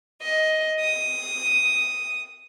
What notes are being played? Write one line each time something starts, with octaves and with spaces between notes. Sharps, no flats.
D#5
D#6